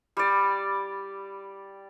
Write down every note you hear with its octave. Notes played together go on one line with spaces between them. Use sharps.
G3 D5